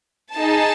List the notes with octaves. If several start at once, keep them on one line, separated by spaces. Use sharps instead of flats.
D#4 G#4 A5